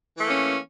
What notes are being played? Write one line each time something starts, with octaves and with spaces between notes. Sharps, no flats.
E3 A3 A#3 C#4